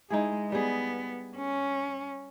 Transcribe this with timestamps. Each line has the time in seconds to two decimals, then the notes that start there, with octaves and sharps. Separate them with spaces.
0.10 G#3 D#4 E4 G#4
0.52 G3 B3 G#4
1.37 C#4